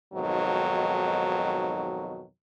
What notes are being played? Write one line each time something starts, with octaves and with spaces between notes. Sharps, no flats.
F2 G#2 B2 D#3 F#3